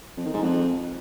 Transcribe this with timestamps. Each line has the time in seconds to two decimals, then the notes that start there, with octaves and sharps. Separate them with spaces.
0.17 F2
0.25 D#3
0.34 G#2
0.42 F2